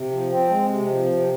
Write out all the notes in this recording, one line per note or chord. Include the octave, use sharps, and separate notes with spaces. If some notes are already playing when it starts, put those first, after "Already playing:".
Already playing: C3
F3
C4
G#3
C3
F3
C3